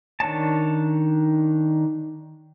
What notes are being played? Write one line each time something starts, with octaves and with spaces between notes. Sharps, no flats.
D#3 D4 C#5 A5